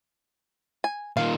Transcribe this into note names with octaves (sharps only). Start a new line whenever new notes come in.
G#5
A#2 D#3 F5